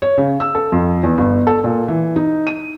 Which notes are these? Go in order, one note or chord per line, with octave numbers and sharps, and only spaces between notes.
C#5
C#3
E6
A4
F2
E2
G1
A4
A#2
E3
D#4
D#7